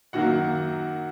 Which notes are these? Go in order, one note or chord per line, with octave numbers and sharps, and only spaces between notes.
F#2 D#3 F#3 A#3 F#4 F#5